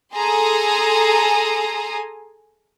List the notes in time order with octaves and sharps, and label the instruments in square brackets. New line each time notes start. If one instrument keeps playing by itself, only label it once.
[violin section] G#4 A4 G#5 A#5 C6 D#6